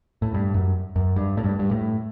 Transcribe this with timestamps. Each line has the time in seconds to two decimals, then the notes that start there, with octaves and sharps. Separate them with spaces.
0.22 A2
0.34 G2
0.54 F#2
0.96 F#2
1.16 G2
1.37 A2
1.44 G2
1.59 G2
1.71 A2